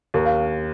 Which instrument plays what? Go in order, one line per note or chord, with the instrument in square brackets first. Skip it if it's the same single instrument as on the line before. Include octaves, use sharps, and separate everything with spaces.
[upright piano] D#2 [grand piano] A#4
[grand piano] F5